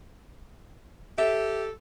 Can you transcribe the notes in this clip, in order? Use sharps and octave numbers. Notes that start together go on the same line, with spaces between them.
G4 A4 E5